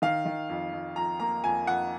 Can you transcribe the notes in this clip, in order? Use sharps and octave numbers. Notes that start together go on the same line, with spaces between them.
D#3 F5
D#3
F2
F2
F2 A#5
A#3 A#5
F2 G#5
F2 F#5